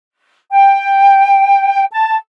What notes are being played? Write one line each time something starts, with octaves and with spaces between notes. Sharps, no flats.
G5
A5